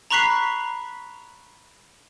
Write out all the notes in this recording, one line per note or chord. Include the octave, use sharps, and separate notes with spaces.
A#5 B5 C#6 F#6 B6 C7